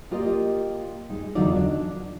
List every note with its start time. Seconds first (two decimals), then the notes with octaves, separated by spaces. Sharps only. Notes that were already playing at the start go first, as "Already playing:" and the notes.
0.11 A#3 F4 G4 D5 D#5
1.10 G#3 D#4
1.35 E2 D3 F#3 D#4 F4 D5
1.56 D4